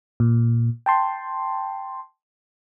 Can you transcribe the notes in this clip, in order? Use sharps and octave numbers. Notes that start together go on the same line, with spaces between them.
A#2
G5 A5 C6